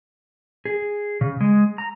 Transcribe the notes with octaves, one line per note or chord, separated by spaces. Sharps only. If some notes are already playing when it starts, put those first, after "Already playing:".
G#4
C#3
G#3
A#5